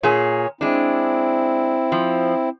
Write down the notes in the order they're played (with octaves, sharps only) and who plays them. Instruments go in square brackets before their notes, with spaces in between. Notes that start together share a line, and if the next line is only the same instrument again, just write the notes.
[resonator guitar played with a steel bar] A#2 G#4 [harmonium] C#5
[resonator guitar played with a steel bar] G#3 D4 [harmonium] C4 E4
[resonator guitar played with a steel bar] F3